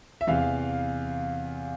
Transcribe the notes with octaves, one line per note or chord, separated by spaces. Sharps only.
E5
E2 C3 E3 F5